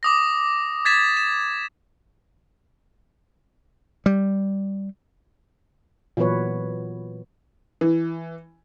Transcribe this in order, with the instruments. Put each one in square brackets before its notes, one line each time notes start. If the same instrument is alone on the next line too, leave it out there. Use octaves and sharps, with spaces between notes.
[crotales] D6 D#6 A#6
G#6 A6 B6 E7
E7
[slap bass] G3
[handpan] A#2 E3 F#3 B3 B4 C#5
[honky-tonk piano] E3